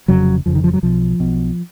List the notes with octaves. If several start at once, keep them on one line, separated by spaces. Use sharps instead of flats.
F1 F2 C#3 F#3
F1 F2 C#3 F3
D#3
F3
F#3
B1 B2 F3
B1 B2